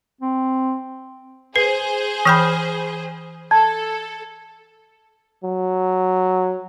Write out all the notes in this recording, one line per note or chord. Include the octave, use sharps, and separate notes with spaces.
C4
G#4 B4 C5 C7
E3 G5 B5 D#6 F6 G6
A4 A5 G#6
F#3